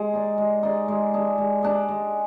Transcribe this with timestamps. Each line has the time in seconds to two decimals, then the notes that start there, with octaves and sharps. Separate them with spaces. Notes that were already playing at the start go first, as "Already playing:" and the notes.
Already playing: G#3
0.13 D#4 G#4 D5
0.38 G#3
0.63 D#4 G#4 D5
0.88 G#3
1.14 D4 G#4
1.38 G#3
1.63 D4 G#4
1.89 G#3